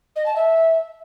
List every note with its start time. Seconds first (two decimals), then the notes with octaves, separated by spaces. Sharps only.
0.16 D#5
0.26 A5
0.36 E5